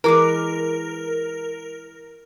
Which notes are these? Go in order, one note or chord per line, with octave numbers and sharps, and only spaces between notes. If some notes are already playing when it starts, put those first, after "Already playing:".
E3 G#3 A#4 B4 A#5 D6